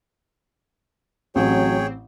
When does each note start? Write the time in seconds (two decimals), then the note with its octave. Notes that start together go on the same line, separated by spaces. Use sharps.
1.36 A1 F#3 C4 G#4 C#5 G5